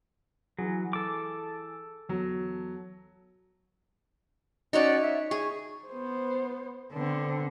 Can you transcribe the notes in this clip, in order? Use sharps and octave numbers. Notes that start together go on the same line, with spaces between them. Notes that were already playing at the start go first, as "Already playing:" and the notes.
E3 F#3 G#4
A4 D6
E2 F#3
C#4 D#4 F#4 C#5 D5 F#5
E5
G#4 C#6
B3 C5
D3 B3 C4